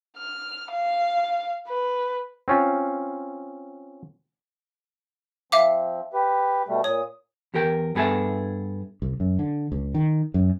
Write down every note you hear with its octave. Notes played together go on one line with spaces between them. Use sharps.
F6
F5
B4
C4 C#4 F4
F3 C4 E5 F5 D6
G4 B4
B2 G3 A3
A#2 C#5 D#6
E2 G4 A#4 G5
G2 B3 G#4 A4 E5
C2
F#2
D3
C#2
D#3
F#2